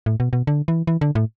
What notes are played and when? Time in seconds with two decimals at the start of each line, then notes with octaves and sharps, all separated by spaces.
0.06 A2
0.20 B2
0.33 B2
0.47 D3
0.68 E3
0.87 E3
1.01 D3
1.15 A2